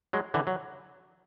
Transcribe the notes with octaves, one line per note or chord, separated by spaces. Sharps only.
F#3 G#3
D3 E3
F#3